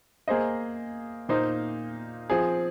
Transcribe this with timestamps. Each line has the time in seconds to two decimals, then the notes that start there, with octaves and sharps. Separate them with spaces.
0.28 A#3 G#4 C5 D#5
1.29 A#2 A#3 D#4 C5
2.30 F3 C4 G#4